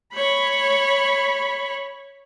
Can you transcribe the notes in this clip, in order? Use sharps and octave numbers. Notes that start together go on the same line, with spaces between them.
C#5 B5